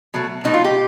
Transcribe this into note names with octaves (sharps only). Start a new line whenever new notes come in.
B2 F#3 A3
B2 F#3 A3 D#4
F4
G4